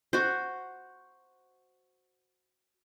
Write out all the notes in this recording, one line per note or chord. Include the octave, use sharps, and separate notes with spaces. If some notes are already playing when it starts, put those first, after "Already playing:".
F#4 C5